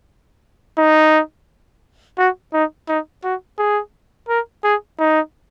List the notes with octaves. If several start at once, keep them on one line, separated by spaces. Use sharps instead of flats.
D#4
F#4
D#4
D#4
F#4
G#4
A#4
G#4
D#4